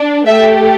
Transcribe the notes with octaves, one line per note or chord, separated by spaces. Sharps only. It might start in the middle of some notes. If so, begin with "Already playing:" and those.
Already playing: D4
A3 G4 E5